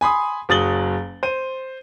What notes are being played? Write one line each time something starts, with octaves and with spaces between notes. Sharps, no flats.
G#5 B5 C6 D#6
F#1 F#3 D#6 A6 F#7 G7
C5 D#7